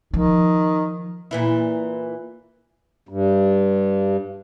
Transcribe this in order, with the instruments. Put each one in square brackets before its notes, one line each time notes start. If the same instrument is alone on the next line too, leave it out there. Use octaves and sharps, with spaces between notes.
[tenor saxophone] D#3 [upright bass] F3
[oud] A#2 E3 E4
[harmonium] G2